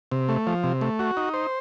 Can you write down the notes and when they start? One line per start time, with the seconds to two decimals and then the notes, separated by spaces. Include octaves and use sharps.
0.12 C3
0.29 A3
0.47 F3
0.64 C3
0.81 A3
0.99 F#4
1.17 D#4
1.34 C5